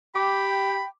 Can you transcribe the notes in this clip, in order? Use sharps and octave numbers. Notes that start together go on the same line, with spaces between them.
G4 G5 B5 D6